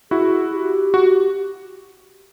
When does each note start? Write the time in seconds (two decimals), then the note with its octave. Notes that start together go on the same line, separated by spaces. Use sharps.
0.11 E4 F#4 G#4
0.52 G4
0.94 F#4